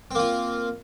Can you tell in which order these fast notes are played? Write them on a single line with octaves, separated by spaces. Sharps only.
C4 A#3 F4